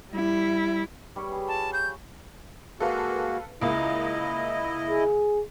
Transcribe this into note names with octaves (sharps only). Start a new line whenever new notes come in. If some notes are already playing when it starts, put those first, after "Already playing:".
G3 E4
G3 B4 C#5
G#4
F4 A5
G6
G#3 A#3 F#4 A4 B4 F5
C#2 C#3 A#3 E4 D#5
G#4